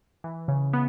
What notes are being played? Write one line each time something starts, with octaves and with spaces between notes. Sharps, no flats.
E3
C#3
B3